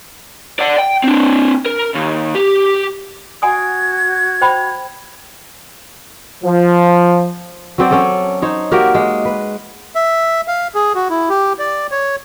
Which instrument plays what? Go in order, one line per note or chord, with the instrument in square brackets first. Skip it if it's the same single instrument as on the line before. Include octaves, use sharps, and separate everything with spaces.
[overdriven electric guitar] D5 F#5
G5
C4 D4
A#4
D#2
G4
[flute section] F#4 G#6 [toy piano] F#5 G#5 D#6
[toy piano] C5 G5 B5
[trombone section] F3
[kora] F#3 C4 D5
C#4 A4 D5 D#5
D#4 C5 C#5
A#3 F#4 G4 A#4
G#3
B4
[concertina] E5
F5
G#4
F#4
E4
G4
D5
C#5